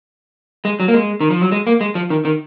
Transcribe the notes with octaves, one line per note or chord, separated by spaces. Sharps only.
G#3
F#3
A#3
G#3
D#3
F3
F#3
G#3
A#3
G#3
F3
D#3
D#3